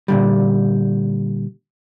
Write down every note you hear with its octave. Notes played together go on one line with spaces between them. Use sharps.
A#2 D3 G3